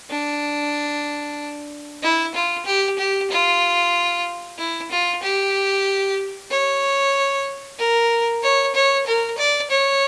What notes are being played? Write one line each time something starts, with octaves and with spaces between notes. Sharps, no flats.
D4
E4
F4
G4
G4
F4
E4
F4
G4
C#5
A#4
C#5
C#5
A#4
D5
C#5